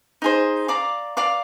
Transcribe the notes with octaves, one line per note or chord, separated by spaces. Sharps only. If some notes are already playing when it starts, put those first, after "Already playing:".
D#4 G#4 C5
D5 F5 A#5 D6
D5 F5 A#5 D6